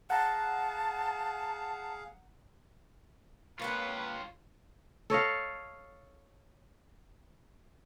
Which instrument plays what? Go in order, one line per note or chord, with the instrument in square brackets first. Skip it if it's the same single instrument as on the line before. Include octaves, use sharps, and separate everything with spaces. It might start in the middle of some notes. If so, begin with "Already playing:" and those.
[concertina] G#4 F5 [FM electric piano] F#5 A#5 [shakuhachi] A5
[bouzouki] A#3 B3 G5 [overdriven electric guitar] F4 C#5 [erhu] B4
[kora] A4 C#5 D#5 F5